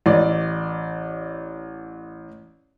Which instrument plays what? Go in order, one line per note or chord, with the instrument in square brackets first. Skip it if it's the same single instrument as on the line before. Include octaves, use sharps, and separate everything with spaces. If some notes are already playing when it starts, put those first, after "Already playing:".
[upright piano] A1 D5